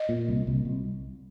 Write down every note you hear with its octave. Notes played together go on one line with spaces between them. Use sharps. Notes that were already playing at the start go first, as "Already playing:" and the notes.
Already playing: D#5
A#2
C2
C2
C2